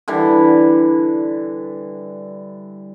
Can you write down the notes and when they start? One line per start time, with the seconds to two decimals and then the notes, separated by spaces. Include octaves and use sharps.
0.08 D3 E3 G3